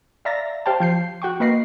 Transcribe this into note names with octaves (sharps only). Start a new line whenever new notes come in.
D5 E5 F5 A#5 A6 A#6
G4 C5 F5 G5 A5
F3 G6 C7
F#4 G5 C#6
A#3 B4 D#5 A#6 C7